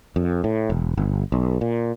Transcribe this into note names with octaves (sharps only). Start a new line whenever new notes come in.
F2
A2
E1
G1
B1
A#2